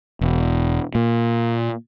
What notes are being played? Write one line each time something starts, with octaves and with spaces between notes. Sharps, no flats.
E1
A#2